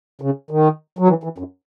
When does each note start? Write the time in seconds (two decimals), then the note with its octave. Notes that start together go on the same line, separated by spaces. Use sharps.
0.21 C#3
0.51 D#3
0.99 F#3
1.09 E3
1.23 E3
1.38 F#2